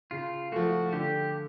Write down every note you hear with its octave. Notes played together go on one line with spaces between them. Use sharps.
C#3 F4
F3 A3 F#4
D3 G4